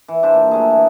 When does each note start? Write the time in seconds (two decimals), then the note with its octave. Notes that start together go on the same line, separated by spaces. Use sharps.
0.08 E3
0.22 G3 D4 C5 E5
0.34 A#2
0.51 F#3 A3 G#4
0.70 E3 A#3